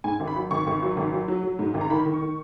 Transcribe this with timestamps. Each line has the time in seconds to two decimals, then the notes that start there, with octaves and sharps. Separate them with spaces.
0.04 G#2 G#5
0.20 G#1
0.27 B5
0.36 F#3
0.51 G#1 C#6
0.67 G#1
0.82 F#3
0.97 G#1
1.13 F#3
1.28 F#3
1.43 F#3
1.59 G#2
1.74 G#1
1.81 A#5
1.90 D#3 B5
2.06 D#3
2.14 C#6
2.21 D#3